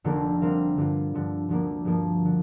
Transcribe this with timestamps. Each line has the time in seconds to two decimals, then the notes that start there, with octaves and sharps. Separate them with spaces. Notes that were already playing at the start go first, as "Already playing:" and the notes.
0.04 F1 F2 D3 A#3 G4
0.41 D3 G3 C4 A#4 F5
0.77 G2 D3 A#3 F4
1.14 G2 D3 F3
1.49 D2 D3 F3 A#3
1.85 G2 F3 A#3 F4
2.25 D3